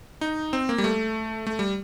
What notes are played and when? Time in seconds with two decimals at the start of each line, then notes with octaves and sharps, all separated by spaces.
0.21 D#4
0.53 C4
0.69 A#3
0.78 G3
0.84 A3
1.47 A3
1.59 G3